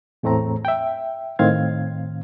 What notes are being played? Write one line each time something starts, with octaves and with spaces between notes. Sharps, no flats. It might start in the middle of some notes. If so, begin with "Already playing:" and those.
E2 A2 A3 C4 A#5
E5 G5
A2 D#3 C4 F5 G#6